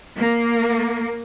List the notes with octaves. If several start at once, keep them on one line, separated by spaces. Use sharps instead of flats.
A#3